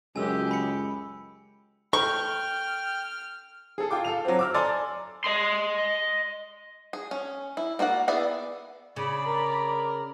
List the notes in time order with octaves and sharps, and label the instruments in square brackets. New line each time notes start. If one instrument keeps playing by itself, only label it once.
[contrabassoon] C#2 [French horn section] F#2 [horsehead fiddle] G#3 G4 [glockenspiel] G#5 E6
[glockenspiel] B5 C#7
[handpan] A4 [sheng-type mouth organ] G5 [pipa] C#6 [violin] F6
[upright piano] G#4 A4
F4 G5 D6
A4 F5 F7
F#3 C4
D6 E6 F6
A4 D5 G#5 A#5 C6 A6
[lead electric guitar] D#5 C6
[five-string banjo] G#4
C#4
E4
A#3 F#4 D5 F#5
B3 E4 G#4 D5
[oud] C#3 [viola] D5 B5
[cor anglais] A#4